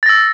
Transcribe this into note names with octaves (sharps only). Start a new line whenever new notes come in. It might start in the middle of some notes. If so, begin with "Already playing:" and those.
E6 A6 A#6